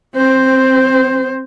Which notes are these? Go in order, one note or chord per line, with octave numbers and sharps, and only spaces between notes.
C4 C5